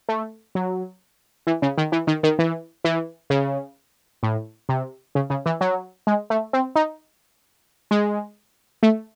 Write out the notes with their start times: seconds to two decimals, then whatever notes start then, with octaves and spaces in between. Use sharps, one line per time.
0.09 A3
0.55 F#3
1.47 E3
1.62 C#3
1.78 D#3
1.92 E3
2.07 D#3
2.23 D#3
2.39 E3
2.85 E3
3.30 C#3
4.23 A2
4.69 C3
5.15 C#3
5.30 C#3
5.46 E3
5.61 F#3
6.07 G#3
6.30 A3
6.53 C4
6.76 D#4
7.91 G#3
8.83 A3